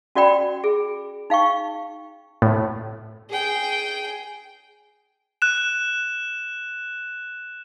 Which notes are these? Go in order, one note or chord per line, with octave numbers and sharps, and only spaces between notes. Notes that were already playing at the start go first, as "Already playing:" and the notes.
C#4 F#4 D5 F#5 G5 B5
G#4
D#4 F5 G5 C#6
A2
G#4 G5
F#6 E7